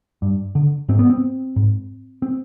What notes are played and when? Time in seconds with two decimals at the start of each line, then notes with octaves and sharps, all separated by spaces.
0.22 G2
0.55 D3
0.89 G#2 C4
0.99 B3
1.10 C4
1.56 G#2
2.22 C4